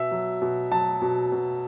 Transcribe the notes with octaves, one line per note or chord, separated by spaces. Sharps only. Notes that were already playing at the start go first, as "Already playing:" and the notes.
Already playing: B2 E5
F#3
B2
F#3 A5
B2
B2